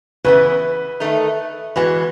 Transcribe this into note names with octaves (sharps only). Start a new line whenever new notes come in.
C#3 E3 B3 B4
D#3 A3 D#4
E3 G#3 B3 F#4 B4